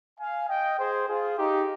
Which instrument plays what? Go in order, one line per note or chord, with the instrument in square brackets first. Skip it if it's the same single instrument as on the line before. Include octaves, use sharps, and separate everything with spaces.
[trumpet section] F5 G#5
D#5 G5
G#4 C5
F4 G#4
D#4 G4